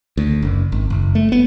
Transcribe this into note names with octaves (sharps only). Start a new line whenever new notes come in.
D2
F#1
G#1
F#1
A3
B3